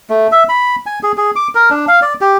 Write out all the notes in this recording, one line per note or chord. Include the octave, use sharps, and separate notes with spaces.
A3
E5
B5
G#5
G#4
G#4
D6
A#4
D4
F5
D5
G4